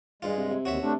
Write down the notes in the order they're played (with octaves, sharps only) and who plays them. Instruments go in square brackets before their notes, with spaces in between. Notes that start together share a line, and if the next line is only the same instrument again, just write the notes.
[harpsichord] G2 F4 [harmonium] G#3
[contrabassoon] C3
C3
[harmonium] D#2 [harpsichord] F#4 C#5 E5
[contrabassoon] C3 [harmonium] A3 D4